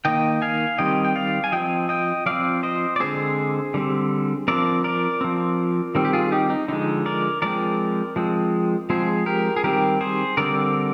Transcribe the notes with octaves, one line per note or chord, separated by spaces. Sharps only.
D#3 A#3 D#5 G5
F5 G#5
D#3 G3 C4 D#5 G5
G5
D5 F5
G#5
F3 C4 D#5 G5
D#5 G5
F3 C4 D5 F5
C5 D#5
D5
D3 G#3 C4 G#4 C5
D3 G3 C4
F3 C4 A#4 D5
A#4 D5
F3 C4
D#3 G3 C4
G4
F4 G#4
D#4 G4
D#4
D3 F3 G#3 D#4
A#4 D5
F3 G#3 C4 A#4 D5
F3 G#3 C4
F3 G#3 C4 G#4 C5
G4 A#4
G#4
D#3 G3 C4 G4 A#4
G#4 C5
D3 G3 C4 A#4 D5